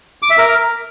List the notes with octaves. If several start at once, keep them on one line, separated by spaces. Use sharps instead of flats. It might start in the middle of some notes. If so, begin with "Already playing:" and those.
D6
E5
A#4